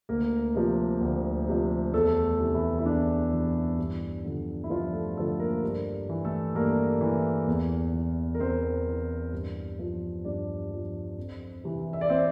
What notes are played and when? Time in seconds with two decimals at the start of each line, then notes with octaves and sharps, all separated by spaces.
0.09 D2 A#3 A#4
0.55 C3 F3
1.01 D2
1.48 C3 F3
1.93 E2 A3 A4
2.39 C3 E3
2.54 E3 E4
2.79 E4
2.85 E2 D4
3.31 C3 E3
3.78 G2
4.25 D3 F3
4.64 E4
4.70 G2 F3 F4
4.93 A3 A4
5.16 D3 F3 A3 A4
5.40 A#3 A#4
5.64 G2
6.09 E3
6.24 A3 A4
6.55 G2 A#3 A#4
7.01 E3
7.47 E2
7.93 E3
8.34 A#4
8.39 E2 C4 C5
8.87 E3
9.32 G2
9.79 F3
10.24 G2 D4 D5
10.71 F3
11.18 F2
11.64 C3 E3
11.93 E5
12.01 D5
12.09 C4 C5